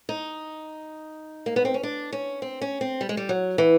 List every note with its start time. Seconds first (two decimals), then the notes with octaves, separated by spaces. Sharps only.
0.09 D#4
1.46 A#3
1.56 B3
1.65 C4
1.74 C#4
1.83 D4
2.13 C#4
2.42 C4
2.61 C#4
2.81 C4
3.01 G3
3.09 G#3
3.17 G3
3.29 F#3
3.58 E3